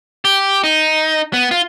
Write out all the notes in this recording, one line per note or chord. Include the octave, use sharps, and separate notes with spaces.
G4
D#4
B3
F4